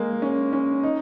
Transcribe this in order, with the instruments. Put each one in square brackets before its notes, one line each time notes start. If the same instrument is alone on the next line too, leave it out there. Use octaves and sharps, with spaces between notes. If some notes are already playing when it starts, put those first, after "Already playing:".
Already playing: [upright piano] G#3 A#3
C#4
C#4
D#4